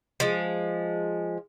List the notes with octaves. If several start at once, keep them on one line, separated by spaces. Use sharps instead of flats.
F3 G#3